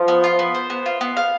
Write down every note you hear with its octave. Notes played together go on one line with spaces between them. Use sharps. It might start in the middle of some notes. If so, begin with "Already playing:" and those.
Already playing: F3
B3
F4
B3
C5
B3
F4
B3
F5